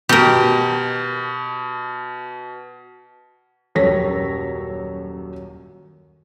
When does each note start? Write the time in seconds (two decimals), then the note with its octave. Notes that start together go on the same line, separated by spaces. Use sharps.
0.09 B2 G4 A#4
3.75 D#1 F#2 A4 C#5 A#6 B6